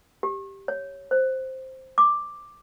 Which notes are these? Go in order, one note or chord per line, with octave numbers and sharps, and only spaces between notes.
G4
C#5
C5
D6